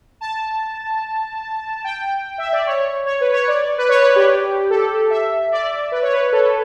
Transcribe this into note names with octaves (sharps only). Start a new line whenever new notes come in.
A5
G5
E5
D5
C#5
C#5
B4
C#5
D5
B4
C#5
B4
G4
A4
E5
D5
B4
C#5
B4
A4